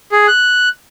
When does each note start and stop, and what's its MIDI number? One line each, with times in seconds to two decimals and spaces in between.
0.12 0.27 68
0.28 0.69 90